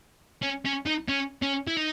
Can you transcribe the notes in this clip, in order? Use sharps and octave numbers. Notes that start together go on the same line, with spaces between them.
C#4
C#4
D#4
C#4
C#4
E4
D#4